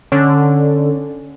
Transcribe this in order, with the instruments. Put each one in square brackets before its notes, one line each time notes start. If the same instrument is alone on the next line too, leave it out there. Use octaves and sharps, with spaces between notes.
[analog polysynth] D3 [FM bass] C#4